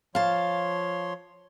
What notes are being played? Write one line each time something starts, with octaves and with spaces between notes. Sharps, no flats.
F3 C#5 F5 A5 C6